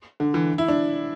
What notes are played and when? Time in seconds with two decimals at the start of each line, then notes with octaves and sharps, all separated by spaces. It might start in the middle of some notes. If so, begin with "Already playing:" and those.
0.20 D3
0.34 E3
0.58 E4
0.68 D4